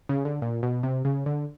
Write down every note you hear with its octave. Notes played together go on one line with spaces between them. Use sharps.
C#3
D3
A#2
B2
C3
C#3
D3